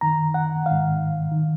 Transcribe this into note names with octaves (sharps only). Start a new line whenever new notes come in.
F#2 D#3 A#5
F#5
G#2 D#3 F5
D#3